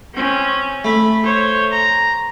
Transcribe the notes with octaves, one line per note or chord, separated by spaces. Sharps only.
C4 C#4
A3 B5
C5 C#5
A#5